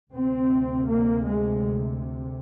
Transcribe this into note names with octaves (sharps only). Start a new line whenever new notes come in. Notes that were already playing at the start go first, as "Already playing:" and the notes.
D2 C3 C4
A#3
G#3